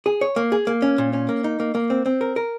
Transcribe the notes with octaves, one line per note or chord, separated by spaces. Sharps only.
G#4
C#5
A#3
G#4
A#3
C#4
A#2
C#4
A#3
D#4
A#3
A#3
C4
C4
A#4
A#4